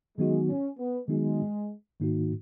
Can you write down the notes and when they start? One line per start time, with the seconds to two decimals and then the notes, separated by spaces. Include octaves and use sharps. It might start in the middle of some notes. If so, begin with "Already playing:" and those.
0.17 D#3 F#3 G#3 B3 D#4 F#4
0.48 C#4
0.78 B3
1.08 D#3 F#3 G#3 B3 D#4 F#4
2.00 G#2 D#3 A#3 D#4 F#4